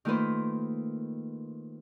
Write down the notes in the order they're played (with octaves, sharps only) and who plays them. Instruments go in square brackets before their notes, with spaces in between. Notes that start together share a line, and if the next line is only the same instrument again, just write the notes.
[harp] D#3 A3 A#3 F4 B4 C5